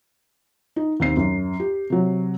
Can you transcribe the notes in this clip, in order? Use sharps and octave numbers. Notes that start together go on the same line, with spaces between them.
D#4
D#2 C4 C7
F#2
G4
C3 F#3